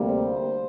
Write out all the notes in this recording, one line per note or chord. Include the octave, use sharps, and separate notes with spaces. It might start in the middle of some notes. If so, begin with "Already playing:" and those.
Already playing: D2 C3 G3 A#3
C5